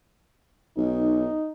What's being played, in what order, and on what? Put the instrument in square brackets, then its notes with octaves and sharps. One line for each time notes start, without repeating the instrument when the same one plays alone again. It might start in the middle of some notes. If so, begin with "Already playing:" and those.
[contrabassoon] B1 [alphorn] D#4